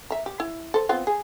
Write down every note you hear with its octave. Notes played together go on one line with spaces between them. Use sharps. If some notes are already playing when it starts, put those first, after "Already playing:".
E5 A#5
G4
E4
A4 C5
B3 C4 F4
G#4